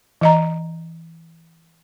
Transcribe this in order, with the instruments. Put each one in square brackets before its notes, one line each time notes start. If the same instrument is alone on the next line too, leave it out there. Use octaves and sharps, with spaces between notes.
[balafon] E3 D#5 A#5